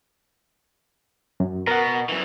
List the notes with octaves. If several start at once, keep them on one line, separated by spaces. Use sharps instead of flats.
F#2
B2 A#4 F#5
F#2 E3